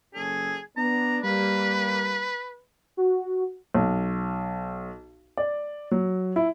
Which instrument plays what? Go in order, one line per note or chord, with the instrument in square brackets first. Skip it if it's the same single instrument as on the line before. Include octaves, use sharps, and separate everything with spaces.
[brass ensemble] F#1 C#4 A4 [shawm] G#4
[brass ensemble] B3 D4 [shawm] A#5
[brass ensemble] G3 A#3 [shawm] B4
[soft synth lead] F#4
[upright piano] B1
D5
F#3
E4